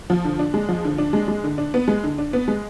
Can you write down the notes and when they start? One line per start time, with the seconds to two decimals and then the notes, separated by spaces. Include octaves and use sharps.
0.10 F3
0.24 D3
0.39 D4
0.54 G#3
0.69 F3
0.84 D3
0.98 D4
1.13 G#3
1.28 G#3
1.44 D3
1.58 D4
1.74 B3
1.88 G#3
2.03 D3
2.18 D4
2.33 B3
2.48 G#3